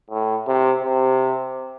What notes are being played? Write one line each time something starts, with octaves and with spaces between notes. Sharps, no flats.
A2
C3
C3